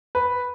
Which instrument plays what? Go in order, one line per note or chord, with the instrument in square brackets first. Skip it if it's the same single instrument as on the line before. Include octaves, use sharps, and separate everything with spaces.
[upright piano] B4